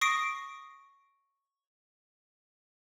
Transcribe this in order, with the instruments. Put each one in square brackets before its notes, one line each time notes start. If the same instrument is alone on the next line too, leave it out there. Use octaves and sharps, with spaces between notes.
[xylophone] C#6 D#6 A#6 C7 D7